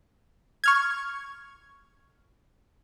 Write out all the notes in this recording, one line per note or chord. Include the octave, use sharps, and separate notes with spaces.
C#6 F6 G#6